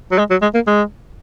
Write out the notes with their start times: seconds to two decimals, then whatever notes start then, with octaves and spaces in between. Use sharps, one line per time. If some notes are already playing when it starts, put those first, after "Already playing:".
0.11 F#3
0.18 G#3
0.31 F#3
0.42 G#3
0.54 A#3
0.67 G#3